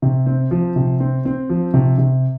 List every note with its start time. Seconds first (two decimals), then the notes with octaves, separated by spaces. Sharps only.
0.02 C3
0.26 C4
0.51 F3
0.76 C3
1.00 C4
1.25 C4
1.50 F3
1.74 C3
1.98 C3